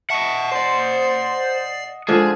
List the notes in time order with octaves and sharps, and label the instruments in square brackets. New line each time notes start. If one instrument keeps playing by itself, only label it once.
[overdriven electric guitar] D#5 F#5 [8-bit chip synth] E5 A5 C#6
[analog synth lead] C5 [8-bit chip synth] D5 C7
[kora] D3 F3 [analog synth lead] G#3 [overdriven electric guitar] G#4